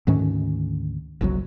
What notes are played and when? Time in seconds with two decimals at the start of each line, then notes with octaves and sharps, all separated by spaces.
0.07 D2 G#2 D#3 C#4
1.21 F#1 C2 C3 F#3